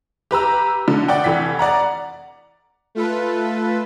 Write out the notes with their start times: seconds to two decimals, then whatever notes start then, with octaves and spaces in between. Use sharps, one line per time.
0.31 G4 B4 A#5 E6
0.88 D3
1.08 D5 F#5 G5
1.24 F1 E3 B6
1.59 D5 F#5 A#5
2.95 A3 F4 A4 B4